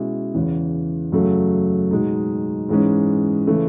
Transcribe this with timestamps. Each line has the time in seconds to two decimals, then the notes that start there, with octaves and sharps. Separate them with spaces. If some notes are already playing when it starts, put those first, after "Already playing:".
Already playing: B2 G#3 C#4 E4
0.34 E2 C#3 E3
1.12 F#2 C#3 F#3 A3
1.91 B2 G#3 D#4
2.69 G#2 E3 G#3 C#4
3.47 C#3 E3 A3